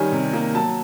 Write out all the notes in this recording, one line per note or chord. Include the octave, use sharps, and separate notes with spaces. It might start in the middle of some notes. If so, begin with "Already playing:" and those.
Already playing: D#3 G3 C#4 G#5
C3
A#3
F#3 A5